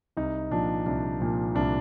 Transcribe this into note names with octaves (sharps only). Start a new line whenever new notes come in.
C2 D#4
A#2 F3 D4
C2 D4
A#2 F3
C2 D4